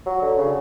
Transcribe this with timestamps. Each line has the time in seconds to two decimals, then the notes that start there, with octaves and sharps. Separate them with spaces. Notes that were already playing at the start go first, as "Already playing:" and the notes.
0.06 F#3
0.22 D3
0.38 C#3